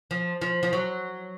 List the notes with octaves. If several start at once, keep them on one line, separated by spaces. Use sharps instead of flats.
F3
F3
F3
F#3